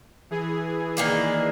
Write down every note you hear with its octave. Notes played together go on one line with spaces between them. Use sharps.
E3 G#4
D#3 A#3 D4